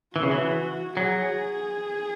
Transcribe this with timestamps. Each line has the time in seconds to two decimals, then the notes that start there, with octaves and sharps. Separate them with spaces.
0.15 E3 F#4
0.23 C#3
0.31 E3
0.97 F#3 G#4